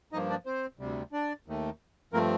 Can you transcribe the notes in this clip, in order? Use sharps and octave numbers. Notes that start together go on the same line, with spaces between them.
G2 F3 A#3 D#4 D#5
D4 D5
C4 C5
D2 C3 G3
D4 D5
D#2 D#3 A3
G2 F3 A3 A#3 C4 A#4